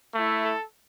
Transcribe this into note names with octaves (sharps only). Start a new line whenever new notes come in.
A3 E4
A4